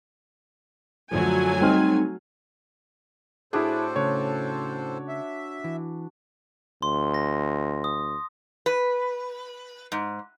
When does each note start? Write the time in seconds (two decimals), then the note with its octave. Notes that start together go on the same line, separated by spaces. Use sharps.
1.11 F#2 D3 F3 F#3 A3 G#5
1.61 G3 C4 D#4 G5 C6 F6
3.53 A2 D4 E4 F#4 G#4 A4 C5
3.96 C#3 A3 C#5
5.08 E5
5.64 E3
6.82 D2 C6
7.14 A#6
7.84 D#6
8.66 B4
9.92 G#2